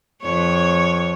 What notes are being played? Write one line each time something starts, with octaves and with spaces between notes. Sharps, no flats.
F2 C#5